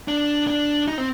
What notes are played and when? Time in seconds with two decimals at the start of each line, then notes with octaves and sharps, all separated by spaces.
0.08 D4
0.47 D4
0.88 D#4
0.98 C4